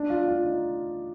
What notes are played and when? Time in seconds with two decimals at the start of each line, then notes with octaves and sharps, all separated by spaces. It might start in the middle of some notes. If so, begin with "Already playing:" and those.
Already playing: D4
0.10 F4
0.28 F4
0.45 D#4